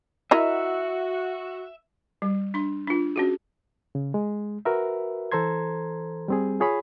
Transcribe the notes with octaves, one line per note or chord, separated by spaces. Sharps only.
E4 F#4 A#4 D#5 E5
G3
D4 C6
D4 F4
C#4 F#4 G#4
C#3
G#3
F#4 A#4 B4 E5
E3 A4 C5 A#5 C6 G#6
G3 C4 G#4
F4 G#4 C#5 B5